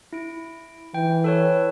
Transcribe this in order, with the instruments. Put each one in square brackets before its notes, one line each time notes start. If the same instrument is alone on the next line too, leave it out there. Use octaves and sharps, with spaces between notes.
[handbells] E4 D7
[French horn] E3 [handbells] G5
[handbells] A4 B4 C#5